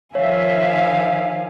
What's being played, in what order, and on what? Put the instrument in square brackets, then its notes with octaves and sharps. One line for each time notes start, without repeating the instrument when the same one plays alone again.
[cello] D#3 F3 [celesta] C#5 [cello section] E5 [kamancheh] F5 G#5